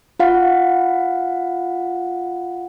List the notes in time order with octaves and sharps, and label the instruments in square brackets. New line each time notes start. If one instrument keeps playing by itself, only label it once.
[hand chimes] F4 F5 F#5